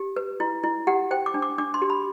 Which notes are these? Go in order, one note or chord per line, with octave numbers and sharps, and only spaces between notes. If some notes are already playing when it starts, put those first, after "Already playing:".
Already playing: G4
B4
E4
E4
G4 F#5
C5 G5
D6
D4
D6
D4 D6
C6
G4
B5